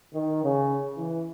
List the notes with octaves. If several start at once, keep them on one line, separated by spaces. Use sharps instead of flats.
D#3
C#3
E3